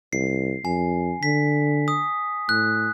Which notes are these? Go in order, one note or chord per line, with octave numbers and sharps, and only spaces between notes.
C2 C7
F2 G#5
D3 B6
D#6
A2 F#6